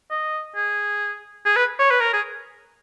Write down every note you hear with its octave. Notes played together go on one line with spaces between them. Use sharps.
D#5
G#4
G#4
B4
C#5
B4
A#4
G#4